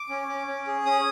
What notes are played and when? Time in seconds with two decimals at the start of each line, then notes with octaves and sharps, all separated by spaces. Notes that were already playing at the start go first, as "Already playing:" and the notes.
Already playing: D6
0.09 C#4
0.28 C#4
0.47 C#4
0.67 G#4
0.85 C#4 D#6